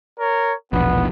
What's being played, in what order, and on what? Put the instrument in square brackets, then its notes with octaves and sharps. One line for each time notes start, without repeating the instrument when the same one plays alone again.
[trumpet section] A#4 C#5
[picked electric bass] E1 A#1 [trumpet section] B3